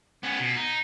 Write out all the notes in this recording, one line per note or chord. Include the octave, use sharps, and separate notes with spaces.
B3 C#4
B2
D#4